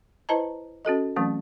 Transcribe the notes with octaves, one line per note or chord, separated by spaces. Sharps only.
E4 B4 C5 D#5 A5 A#5
C#4 F#4 A4 D#5
E3 F#3 A3 C4 C#4